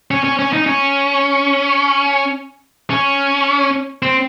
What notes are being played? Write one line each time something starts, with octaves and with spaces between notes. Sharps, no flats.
C#4
C#4
C#4
D#4
C#4
C#4
C4